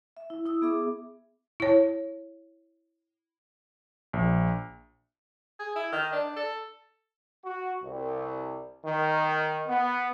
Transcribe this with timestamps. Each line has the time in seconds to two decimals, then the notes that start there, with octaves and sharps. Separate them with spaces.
0.17 E5
0.30 E4
0.46 E4 D#6 E6
0.62 B3 G#4 E5 D6
1.60 E4 C#5
4.13 A#1
5.59 G#4
5.76 E4
5.92 D#3
6.12 D4
6.36 A4
7.45 F#4
7.83 C2
8.85 D#3
9.68 B3